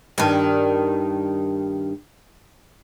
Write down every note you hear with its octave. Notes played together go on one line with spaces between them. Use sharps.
G2 D#3